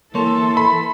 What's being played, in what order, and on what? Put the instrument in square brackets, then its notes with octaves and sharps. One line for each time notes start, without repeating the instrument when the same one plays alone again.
[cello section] E3 A4 [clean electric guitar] A#3 C#5 [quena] C6
[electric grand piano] B5